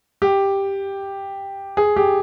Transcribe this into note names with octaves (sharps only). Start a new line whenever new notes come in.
G4
G#4
G4